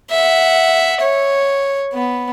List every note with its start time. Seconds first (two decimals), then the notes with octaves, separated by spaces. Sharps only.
0.10 E5 F#5
1.01 C#5
1.93 B3